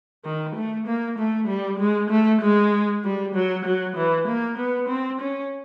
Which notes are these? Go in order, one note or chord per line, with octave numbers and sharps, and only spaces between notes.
D#3
A3
A#3
A3
G3
G#3
A3
G#3
G3
F#3
F#3
E3
A#3
B3
C4
C#4